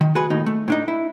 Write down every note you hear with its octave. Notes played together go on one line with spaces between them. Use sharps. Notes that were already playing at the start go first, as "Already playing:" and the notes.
D#3
F#4 G#4 B4
D#2 A2 D#4
A3
A2 D4 D#4
E4